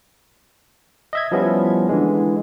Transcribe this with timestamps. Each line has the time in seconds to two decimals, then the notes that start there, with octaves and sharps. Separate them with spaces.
1.13 D#5 E5 G#6
1.32 F3 G3 B3 C#4 E4
1.89 D3 E3 G#3